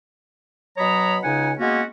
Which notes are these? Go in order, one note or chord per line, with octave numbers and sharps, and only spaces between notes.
B2 F#3 C#5 A#5 B5 D#6
C#2 C#3 D#4 F#5 G#5
G#3 A#3 B3 C#4 F#4